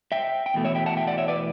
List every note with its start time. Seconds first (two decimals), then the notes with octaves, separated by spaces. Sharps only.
0.12 E5 G5
0.46 G5
0.54 E2 B2 A3
0.65 C#5 E5
0.75 E5 G5
0.86 F#5 A5
0.97 E5 G5
1.07 D5 F#5
1.18 C#5 E5
1.28 B4 D5